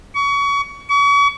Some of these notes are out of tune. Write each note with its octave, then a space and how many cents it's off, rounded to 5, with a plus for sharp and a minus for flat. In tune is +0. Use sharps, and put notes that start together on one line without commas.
C#6 +30
C#6 +40